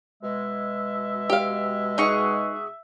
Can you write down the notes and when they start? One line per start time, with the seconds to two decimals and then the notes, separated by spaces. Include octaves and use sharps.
0.23 B2 G#3 E5
1.30 G4 F5
1.98 D#4 G#4 F#5 C#6